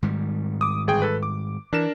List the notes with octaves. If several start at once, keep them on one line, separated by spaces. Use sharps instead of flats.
G#2 D#3 G3
D6 D#6
G1 G#4 G5
A4 B4
D6
E3 D4 A#4 E7